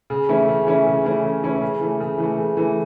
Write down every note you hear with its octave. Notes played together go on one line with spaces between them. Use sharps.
C#3
E3 A3 C#4 E4
C#3
E3 A3 C#4 E4
C#3
E3 A3 C#4 E4
C#3
E3 A3 C#4 E4
C#3
E3 A3
C#3
E3 A3
C#3
E3 A3